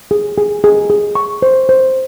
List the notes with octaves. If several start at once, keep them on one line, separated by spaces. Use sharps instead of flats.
G#4
G#4
G#4
G#4
C#6
C5
C5